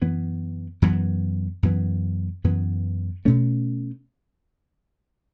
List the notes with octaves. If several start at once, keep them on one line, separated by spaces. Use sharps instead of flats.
F#2 E3 B3
F#2 E3 B3
F#2 E3 B3
F#2 E3 B3
B2 A3 C#4